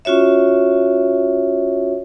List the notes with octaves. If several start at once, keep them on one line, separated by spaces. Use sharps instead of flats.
C#4 F4 F#4 C#5 E5